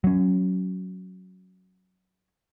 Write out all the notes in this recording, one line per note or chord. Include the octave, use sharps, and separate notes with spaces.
F#3 C#4